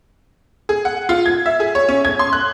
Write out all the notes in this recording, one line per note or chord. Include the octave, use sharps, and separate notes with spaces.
G#4
F#5
F4
G#6
E5
G#4
C#5
C#4
G#6
C6
F#6